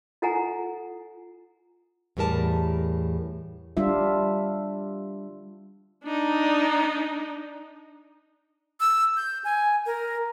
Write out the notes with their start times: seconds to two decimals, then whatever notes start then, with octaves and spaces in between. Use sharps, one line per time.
0.22 E4 F4 A4 F#5 G#5 A#5
2.17 E2 A2 G3 A#4 A5
3.77 G3 D4 F4 E5
6.04 D4 D#4
8.80 E6
9.17 G6
9.44 G#5
9.86 A#4